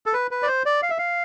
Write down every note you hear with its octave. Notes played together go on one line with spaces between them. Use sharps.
A4
B4
B4
D5
C5
D5
F5
E5
F5